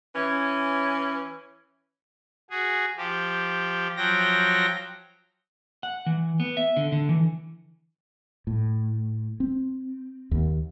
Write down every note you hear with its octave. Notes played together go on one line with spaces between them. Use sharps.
E3 C#4
F#4 G#4
F3 G4
F3 F#3 F#4 G5 A#6
F#5
E3
B3
E5
D3
D3
E3
A2
C4
D#2